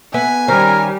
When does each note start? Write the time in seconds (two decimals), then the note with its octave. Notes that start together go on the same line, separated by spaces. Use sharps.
0.14 B3 B4 E5 G#5
0.48 D#3 G3 C#4 A#4 C5